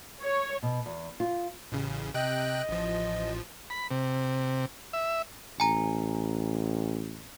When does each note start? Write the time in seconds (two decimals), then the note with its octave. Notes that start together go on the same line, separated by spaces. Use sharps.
0.22 C#5
0.63 B2
0.86 E2
1.20 F4
1.72 A1 C#3
2.14 C3 D#5 G5 F#6
2.69 A1 F3
3.70 B5
3.91 C3
4.93 E5
5.60 A1 G#5 A#5